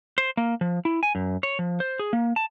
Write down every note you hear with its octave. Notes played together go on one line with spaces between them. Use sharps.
C5
A#3
F3
E4
G#5
F#2
C#5
F3
C5
G#4
A#3
A5